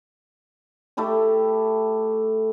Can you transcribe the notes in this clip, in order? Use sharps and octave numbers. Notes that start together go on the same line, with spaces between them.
A3 E4 G4 G5